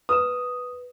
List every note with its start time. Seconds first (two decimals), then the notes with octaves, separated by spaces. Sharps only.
0.09 B4 D#6 E7